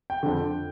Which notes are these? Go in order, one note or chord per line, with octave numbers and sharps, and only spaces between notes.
G5
F2 D3